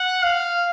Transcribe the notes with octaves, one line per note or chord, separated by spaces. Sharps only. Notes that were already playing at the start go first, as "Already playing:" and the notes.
Already playing: F#5
F5